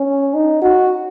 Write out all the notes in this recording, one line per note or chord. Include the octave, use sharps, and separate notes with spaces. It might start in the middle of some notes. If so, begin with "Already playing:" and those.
Already playing: C#4
D#4
F#4